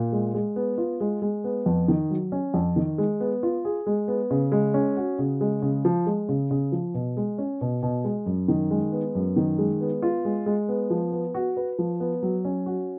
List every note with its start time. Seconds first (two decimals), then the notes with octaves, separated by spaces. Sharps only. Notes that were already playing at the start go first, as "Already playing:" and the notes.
Already playing: A#2
0.13 G#3
0.34 G#3
0.56 B3
0.78 F4
1.00 G#3
1.22 G#3
1.44 B3
1.66 F2
1.88 D#3
2.10 F#3
2.32 C#4
2.54 F2
2.76 D#3
2.98 G#3
3.20 B3
3.43 F4
3.65 G#4
3.86 G#3
4.08 B3
4.31 C#3
4.52 G#3
4.74 C#4
4.96 F#4
5.19 C#3
5.41 G#3
5.62 C#3
5.85 F3
6.06 G#3
6.29 C#3
6.51 C#3
6.72 F3
6.94 B2
7.17 G#3
7.38 C#4
7.61 B2
7.83 B2
8.04 G#3
8.26 F#2
8.48 D#3
8.71 G#3
8.92 B3
9.15 F#2
9.36 D#3
9.58 G#3
9.81 B3
10.02 F4
10.25 G#3
10.46 G#3
10.69 B3
10.90 F3
11.12 B3
11.34 F#4
11.57 B4
11.79 F3
12.00 B3
12.22 F#3
12.45 C#4
12.66 F#4